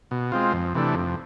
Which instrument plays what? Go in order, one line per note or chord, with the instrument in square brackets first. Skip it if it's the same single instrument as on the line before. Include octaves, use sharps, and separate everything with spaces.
[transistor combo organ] B2
G#3 C4 F4
F2
C3 E3 A3 D4
F2